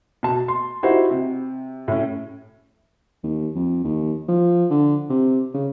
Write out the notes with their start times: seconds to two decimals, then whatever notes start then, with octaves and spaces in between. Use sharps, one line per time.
0.23 B2 A5
0.48 C6
0.83 D#4 E4 F#4 G4 C5
1.11 C3
1.88 A2 C#4
3.23 D#2
3.55 F2
3.84 D#2
4.28 F3
4.70 D3
5.10 C3
5.54 C#3